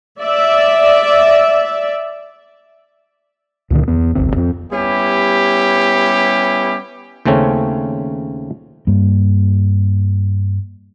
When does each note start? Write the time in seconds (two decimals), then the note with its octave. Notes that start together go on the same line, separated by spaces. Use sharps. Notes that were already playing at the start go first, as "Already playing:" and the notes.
0.22 D5 E5
3.70 C#2 A#2 D3 D#3
3.88 E2 B3
4.15 D#1 G#1 C#2 C4
4.36 F2 C4
4.72 G3 B3 C#4 E4 G4
7.25 D#2 C#3 A3 C4 C#4
8.87 G2 G3 A#3